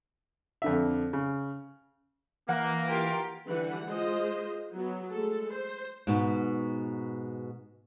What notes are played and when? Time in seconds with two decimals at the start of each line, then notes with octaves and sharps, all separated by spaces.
0.62 F2 D3 E5
1.13 C#3
2.49 E3 A#3 F#5
2.88 F4 G4 A#4
3.48 D3 E3 G3 B4 F#5
3.86 G#3 F4 C5 D#5
4.73 F#3 B3
5.10 G#3 A3 A4
5.52 C5
6.07 G#2 B2